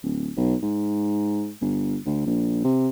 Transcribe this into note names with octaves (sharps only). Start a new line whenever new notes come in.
D1
B1
G#2
G1
D2
A#1
C3